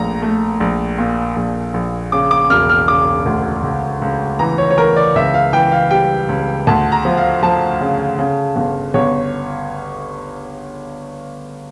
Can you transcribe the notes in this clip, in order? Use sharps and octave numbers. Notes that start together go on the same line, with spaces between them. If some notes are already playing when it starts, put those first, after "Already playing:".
Already playing: A#1 A#2 A3 A#5
A3
A#1
A#2
A#1
A#1
C#3 D6
D6
E1 F6
F6
C#3 D6
D2
C#2
C#2
E3 A#5
C#5
C#5
E3 A#4
D5
C#2 E5
F5
E3 G5
F5
G3 G5
C#2
D2 A5
A#5
F3
F5
F3 A5
C#3
C#3
G1
G1 C#5